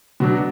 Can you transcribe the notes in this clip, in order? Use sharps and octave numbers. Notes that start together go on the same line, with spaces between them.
B2 F#3 D4